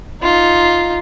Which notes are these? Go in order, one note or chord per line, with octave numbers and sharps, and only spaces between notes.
D#4 F4